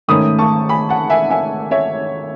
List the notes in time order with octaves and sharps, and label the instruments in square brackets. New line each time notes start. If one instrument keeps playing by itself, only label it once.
[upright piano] G#2 D#3 A3 C#4 B5 D#6
A5 C#6
G#5 B5
F#5 A5
E5 G#5
E5 G#5
C#5 E5